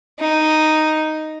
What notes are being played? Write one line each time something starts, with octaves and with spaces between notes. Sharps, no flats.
D#4